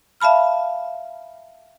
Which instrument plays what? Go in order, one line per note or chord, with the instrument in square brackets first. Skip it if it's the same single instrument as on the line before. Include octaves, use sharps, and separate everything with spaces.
[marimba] E5 F5 A5 B5 F6